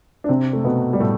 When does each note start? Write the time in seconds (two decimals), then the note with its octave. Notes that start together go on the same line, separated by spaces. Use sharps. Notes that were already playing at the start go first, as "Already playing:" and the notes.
0.24 D4
0.29 C3 C4
0.53 A3
0.64 B2 B3
0.93 G3
1.00 A2 A3